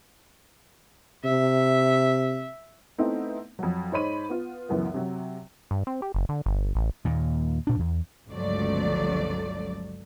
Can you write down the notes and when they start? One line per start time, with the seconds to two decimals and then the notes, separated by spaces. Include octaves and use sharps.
1.24 C3 E5
2.98 A3 B3 C4 D#4 E4
3.59 F2 F#3
3.92 G#2 C5 C#5 D#5 B5 D#7
4.29 B3 F4
4.69 C#2 F#2 E3 B3
4.94 C3 F#3
5.71 G2
5.87 C4
6.02 G4
6.15 F#1
6.29 D3
6.46 G1
6.75 A1
7.05 D#2 A#2
7.67 A#2 D4
7.79 E2
8.29 G1 C#2 F3 F#3 A3 D5